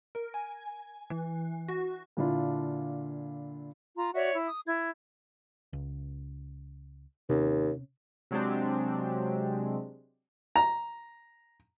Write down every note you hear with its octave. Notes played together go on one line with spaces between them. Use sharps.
A#4
G#5
E3
F#4
A#2 D3 D4 E4 F4
F4 A#5
F#4 C#5 D5 E5
E4
D#6
E4 G#6
C#2
D#2 C3 C#4
C3 F#3 G#3 C4 D4 G4
A#5